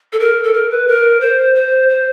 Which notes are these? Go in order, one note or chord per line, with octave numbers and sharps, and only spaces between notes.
A4
A#4
A4
A#4
B4
A#4
C5
C5
C5